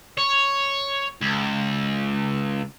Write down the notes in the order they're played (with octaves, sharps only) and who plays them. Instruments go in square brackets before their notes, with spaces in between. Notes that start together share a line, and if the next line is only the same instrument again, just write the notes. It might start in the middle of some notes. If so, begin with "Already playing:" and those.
[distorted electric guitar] C#5
C#2